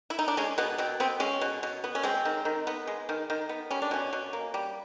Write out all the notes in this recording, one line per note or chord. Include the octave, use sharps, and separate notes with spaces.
E4
D#4
D4
G#3 C#4
B2 B3
B2 C4
B3 C4
G#3 C#4
B2
B2
B3
C#4
G#3 C4
D#3
D#3
B3
G#3
D#3
D#3
B3
G3 C#4
D4
B2 C#4
B2
A#3
G3